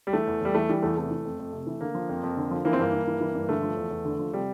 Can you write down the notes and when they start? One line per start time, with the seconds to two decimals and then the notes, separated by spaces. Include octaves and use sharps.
0.07 G3
0.13 E3 A3
0.27 E2
0.41 E2 G3
0.55 E3 A3
0.69 E3 G3
0.83 E2 A3
0.97 C3 A3
1.11 E3
1.25 F2
1.39 F2
1.53 C3
1.67 E3
1.81 D3 A#3
1.95 F3
2.09 F2
2.23 F2
2.37 D3
2.51 F3
2.65 E3 A#3
2.73 C4
2.79 G2 A#3
2.93 G2
3.07 E3
3.21 E3
3.35 G2
3.49 D3 A3
3.63 F3
3.77 E2
3.91 E2
4.05 D3
4.19 F3
4.33 C3 G3